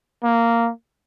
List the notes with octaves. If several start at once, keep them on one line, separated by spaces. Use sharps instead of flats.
A#3